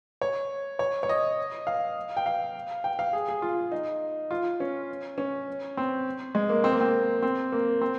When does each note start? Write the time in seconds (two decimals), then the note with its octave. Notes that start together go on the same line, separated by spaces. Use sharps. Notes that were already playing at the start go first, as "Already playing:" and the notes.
0.22 C#5
0.79 C#5
1.03 C#5
1.09 D#5
1.67 F5
2.17 G5
2.26 F5
2.84 G5
2.99 F5
3.13 G#4
3.29 G#4
3.42 F4
3.72 D#4
4.31 F4
4.60 C#4
5.18 C#4
5.77 C4
6.35 G#3
6.49 A#3
6.64 C4
6.72 A#3
6.81 C4
7.22 C4
7.52 A#3
7.81 C4